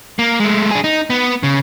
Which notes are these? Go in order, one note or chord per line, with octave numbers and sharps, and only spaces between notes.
A#3
G#3 A3
D4 G#4
D#4
B3
C#3